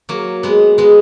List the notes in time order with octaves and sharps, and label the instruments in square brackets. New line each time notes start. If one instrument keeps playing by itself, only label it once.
[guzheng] F#3 A#3
G#3 B3
G#3 B3